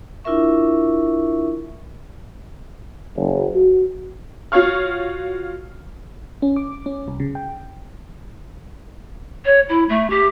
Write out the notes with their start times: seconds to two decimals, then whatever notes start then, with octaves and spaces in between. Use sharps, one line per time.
0.24 D4 E4 F4 A#4 E5 C#6
3.15 F#1
3.55 F#4
4.52 F4 F#4 C#5 F5 C#6 F6
6.42 C#4
6.56 D6
6.86 C#4
7.08 C2
7.20 C#3
7.35 G5
9.45 C#5
9.69 E4
9.89 A3
10.10 G4